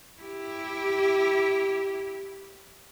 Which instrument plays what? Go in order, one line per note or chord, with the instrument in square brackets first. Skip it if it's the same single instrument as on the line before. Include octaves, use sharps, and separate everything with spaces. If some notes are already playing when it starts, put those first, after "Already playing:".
[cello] E4 G4